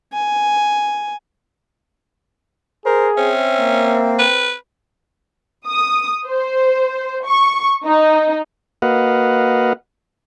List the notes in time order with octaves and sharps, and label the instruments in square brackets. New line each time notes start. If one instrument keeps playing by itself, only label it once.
[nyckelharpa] G#5
[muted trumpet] G#4 [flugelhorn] A#4 [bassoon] C5
[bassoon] C4 [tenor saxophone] C#4 [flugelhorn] E5
[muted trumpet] A#3
[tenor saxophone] B4
[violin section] D#6
C5
C#6
D#4
[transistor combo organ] A#3 F#4 B4 D#5 F5 F#5